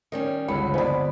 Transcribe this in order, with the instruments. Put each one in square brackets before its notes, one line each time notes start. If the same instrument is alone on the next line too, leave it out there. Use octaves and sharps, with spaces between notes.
[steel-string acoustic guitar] D#3 G3 C#4
[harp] G1 C#2 C#7 [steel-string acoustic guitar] F#4 [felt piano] B5
[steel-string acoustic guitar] F2 D5 [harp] D3 B3 [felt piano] C5 G#5 B5